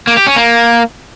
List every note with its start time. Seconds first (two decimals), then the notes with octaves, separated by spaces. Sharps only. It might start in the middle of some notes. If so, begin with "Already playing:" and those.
0.07 A#3
0.17 G4
0.27 C#4
0.36 A#3